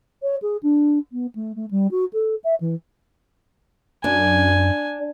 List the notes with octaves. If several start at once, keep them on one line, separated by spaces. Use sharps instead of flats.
C#5
G#4
D4
B3
A3
A3
G3
F#4
A4
E5
E3
F#2 D4 G#5